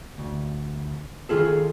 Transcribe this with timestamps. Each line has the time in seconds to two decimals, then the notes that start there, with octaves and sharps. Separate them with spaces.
0.18 D2
1.29 D#3 F3 F4 G#4 A4